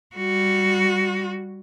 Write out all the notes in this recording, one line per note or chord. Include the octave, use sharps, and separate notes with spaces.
G3 F#4